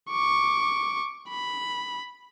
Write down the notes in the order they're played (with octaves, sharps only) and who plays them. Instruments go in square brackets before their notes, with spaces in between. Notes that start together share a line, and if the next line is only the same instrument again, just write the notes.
[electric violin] C#6 D6
B5